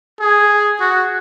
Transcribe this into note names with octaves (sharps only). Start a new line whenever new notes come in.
G#4
F#4